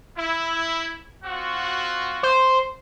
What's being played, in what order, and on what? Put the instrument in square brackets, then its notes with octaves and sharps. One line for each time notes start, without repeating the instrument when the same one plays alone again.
[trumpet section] E4
C4 F4 F#4
[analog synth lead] C5